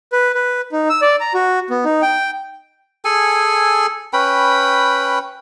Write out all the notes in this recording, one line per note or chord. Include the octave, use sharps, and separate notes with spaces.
B4
B4
D#4
E6
D5
A#5
F#4
B3
D#4
G5
G#4 A4 G#5
C#4 B4 G5 B5